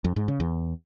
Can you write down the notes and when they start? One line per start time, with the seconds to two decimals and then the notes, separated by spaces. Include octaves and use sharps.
0.04 F2
0.16 G#2
0.28 C#3
0.40 E2